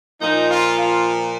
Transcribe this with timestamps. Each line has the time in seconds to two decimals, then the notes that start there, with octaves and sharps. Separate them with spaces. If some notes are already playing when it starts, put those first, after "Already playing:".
0.21 A#2 F3 D#4
0.50 F4
0.80 F4